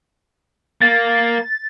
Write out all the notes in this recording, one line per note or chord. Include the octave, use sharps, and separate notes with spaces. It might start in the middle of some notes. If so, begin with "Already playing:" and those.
A#3 A6